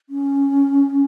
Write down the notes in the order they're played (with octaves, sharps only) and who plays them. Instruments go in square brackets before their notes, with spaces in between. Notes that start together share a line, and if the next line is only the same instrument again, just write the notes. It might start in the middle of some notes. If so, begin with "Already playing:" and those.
[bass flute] C#4